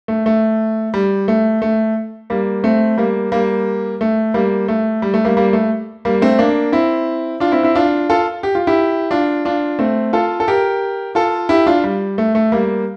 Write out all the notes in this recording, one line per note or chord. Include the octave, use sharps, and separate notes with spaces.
A3
A3
G3
A3
A3
G3 A#3
A3 C4
G3 A#3
G3 A#3
A3
G3 A#3
A3
G3
A3
G3 A#3
G3 A#3
A3
G3 A#3
A3 C4
A#3 D4
C4 E4
D4 F4
C4 E4
C4 E4
D4 F4
F4 A4
G4
F4
E4 G4
D4 F4
D4 F4
A3 C4
F4 A4
A4
G4 A#4
F4 A4
E4 G4
D4 F4
G3
A3
A3
G3 A#3